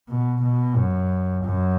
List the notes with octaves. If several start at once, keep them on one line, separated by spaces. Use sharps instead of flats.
B2
B2
F#2
F#2